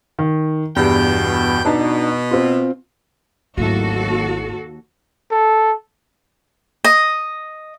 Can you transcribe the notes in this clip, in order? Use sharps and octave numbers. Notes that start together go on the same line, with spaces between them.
D#3
E2 G2 B2 G5
B2 D4 D#4 A5
C4 F4
G#1 D#2 F#3 A3 E4 F#4 A4
A4
D#5